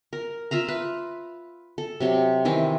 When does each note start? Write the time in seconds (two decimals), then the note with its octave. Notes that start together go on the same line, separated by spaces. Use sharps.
0.13 A#4
0.51 F4 E5 F5 A#5
0.68 B4
1.78 A4
2.00 C3 F#3 G4
2.45 D#3 E3 C4